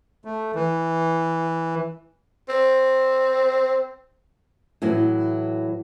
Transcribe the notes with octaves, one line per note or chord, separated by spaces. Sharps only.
A3
E3
C4
A2 E3 F#3